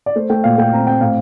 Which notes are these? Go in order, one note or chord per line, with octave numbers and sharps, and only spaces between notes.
D5
A3 C5
A3 G5
A#2 F5
A3 G5
C4 A#5
C4 G5
A2 F5